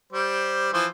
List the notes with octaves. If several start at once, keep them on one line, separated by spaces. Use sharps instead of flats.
G3 C5
E3 F3 C5